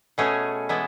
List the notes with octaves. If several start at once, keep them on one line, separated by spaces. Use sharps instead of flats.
B2 A3 C#4 G#4
E3 G#3 B3 E4